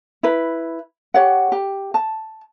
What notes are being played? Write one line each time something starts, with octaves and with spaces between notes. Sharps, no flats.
E4 B4
G4 C#5 F#5
G4
A5